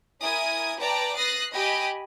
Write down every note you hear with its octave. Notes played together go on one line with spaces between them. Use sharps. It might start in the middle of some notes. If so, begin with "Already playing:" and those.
E4 A#4 G#5 D#6 G#6
B4 D5 G5 A5 A#5 D6
D#6 F#6 A6 A#6 C7
G4 D#5 G5 G#5 B5 D7